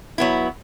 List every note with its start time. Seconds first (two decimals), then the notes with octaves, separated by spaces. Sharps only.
0.18 F#3 B3 E4